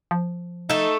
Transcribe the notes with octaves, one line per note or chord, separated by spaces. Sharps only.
F3
A3 D#4 A4